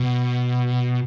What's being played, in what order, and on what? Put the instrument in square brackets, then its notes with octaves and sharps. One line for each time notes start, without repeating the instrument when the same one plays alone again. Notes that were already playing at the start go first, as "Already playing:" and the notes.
Already playing: [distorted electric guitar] B2